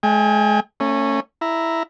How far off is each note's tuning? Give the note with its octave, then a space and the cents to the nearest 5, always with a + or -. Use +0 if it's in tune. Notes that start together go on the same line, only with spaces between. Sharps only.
G#3 +35 G#5 -45
A3 +35 C#4 -10
E4 +0 A#5 +0